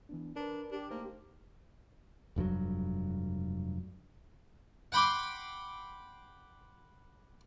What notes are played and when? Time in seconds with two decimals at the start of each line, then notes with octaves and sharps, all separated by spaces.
0.09 E3 B3 D4
0.36 D4 A#4 B4
0.72 D4 G4
0.90 A3 A#3 D#4 C5
2.36 F1 G2 A#2 F#3
4.92 F#5 G5 B5 C6 D6